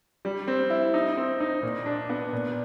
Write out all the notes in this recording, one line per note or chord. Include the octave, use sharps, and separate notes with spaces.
G3
C4
E4
D#4
C4
D#4
A#2
D4
B3
A#2